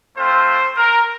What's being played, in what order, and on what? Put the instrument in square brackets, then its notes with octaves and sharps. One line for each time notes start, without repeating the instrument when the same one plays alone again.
[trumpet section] A3 C4 F4 C5
A#4